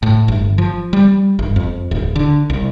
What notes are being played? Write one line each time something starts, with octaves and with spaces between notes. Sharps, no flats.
A2
G1
F3
G3
G1
F2
D1
D3
C2